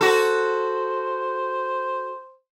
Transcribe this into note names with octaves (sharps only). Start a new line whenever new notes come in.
F#4 A4 C5